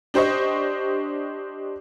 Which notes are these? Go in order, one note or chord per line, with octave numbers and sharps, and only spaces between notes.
D4 G4 C5 D#5 C#6